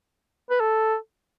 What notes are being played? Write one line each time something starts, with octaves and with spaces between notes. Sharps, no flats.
B4
A4